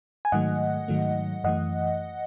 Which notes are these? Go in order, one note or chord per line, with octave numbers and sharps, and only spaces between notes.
G#5
G#2 D#3 F#3 A3 D#5 F#5
G#2 D#3 F#3 A3
F#2 E3 A3 D#5 F#5